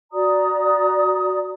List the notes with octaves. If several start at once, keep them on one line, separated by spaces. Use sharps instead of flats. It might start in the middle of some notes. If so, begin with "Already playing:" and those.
F#4 D5 A#5 D#6